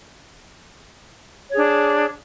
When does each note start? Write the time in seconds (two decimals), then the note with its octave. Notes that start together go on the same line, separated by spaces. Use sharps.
1.50 C#5
1.54 G#4
1.57 D4